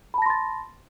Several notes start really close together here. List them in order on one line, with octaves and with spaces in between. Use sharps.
B5 A5 A#6 C6 A6